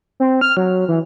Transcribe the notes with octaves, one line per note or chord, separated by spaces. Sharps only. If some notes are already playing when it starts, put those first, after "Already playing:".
C4
F6
F#3
E3